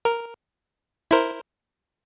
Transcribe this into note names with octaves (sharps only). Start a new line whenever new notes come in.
A#4
E4 A#4 C5